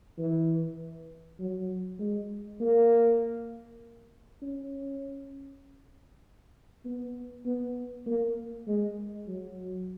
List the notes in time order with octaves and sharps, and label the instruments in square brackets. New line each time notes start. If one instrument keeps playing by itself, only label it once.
[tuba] E3
F#3
G#3
A#3
C#4
B3
B3
A#3
G#3
F#3